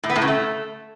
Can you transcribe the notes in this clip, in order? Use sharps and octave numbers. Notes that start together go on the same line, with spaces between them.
A2
B3
A2
C#3
A3